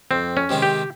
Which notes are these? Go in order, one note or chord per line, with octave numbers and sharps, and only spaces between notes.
F2 C4
C#4
C3 D#3 G#3 C4
G4